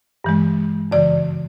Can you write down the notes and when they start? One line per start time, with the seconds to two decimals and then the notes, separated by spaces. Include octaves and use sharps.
0.24 G2 E3 G#3
0.91 F#2 C#3 E3 D5